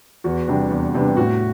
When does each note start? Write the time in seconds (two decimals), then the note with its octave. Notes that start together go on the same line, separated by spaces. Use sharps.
0.24 E2 F#4
0.48 C3 G3 B3 D4
0.70 E2
0.94 C3 G3 B3 D4
1.17 A2 F#4